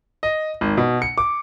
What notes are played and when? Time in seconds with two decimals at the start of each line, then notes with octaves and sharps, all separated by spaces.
0.23 D#5
0.61 G#1
0.77 B2
1.02 C#7
1.18 D6